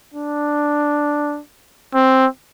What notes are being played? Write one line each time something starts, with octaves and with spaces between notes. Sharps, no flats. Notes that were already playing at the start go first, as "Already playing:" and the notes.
D4
C4